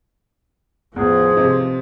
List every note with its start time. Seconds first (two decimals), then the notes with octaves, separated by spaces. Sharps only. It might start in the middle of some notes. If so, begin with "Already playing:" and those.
0.96 A1 E2 F3 G#4
1.37 C3 D#4